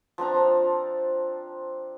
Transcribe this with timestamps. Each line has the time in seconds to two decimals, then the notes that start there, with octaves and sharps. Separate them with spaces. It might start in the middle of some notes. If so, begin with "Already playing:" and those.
0.18 F3 C4 D4 A#5